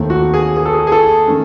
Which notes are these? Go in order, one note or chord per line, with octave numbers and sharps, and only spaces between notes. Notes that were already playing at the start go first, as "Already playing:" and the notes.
Already playing: D#2 D#3 A3 C4
F#4
G#4
G#4
A4
G#4
G#4
A4
D#3 A3 C#4